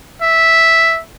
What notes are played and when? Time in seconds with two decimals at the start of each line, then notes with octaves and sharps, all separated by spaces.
0.22 E5